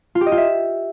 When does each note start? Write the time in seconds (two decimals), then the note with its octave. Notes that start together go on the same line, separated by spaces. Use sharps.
0.15 F4
0.21 G4
0.26 D#5
0.32 F4
0.37 E5